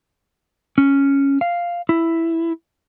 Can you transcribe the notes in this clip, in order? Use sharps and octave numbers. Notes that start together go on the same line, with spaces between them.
C#4
F5
E4